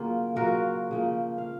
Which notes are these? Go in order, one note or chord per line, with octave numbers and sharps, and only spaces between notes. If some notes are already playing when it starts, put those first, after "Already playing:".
Already playing: C#3 F#3 A#3 F4
C#3 F#3 A#3 F4 F#4 A#4
C#3 F3 A#3
F5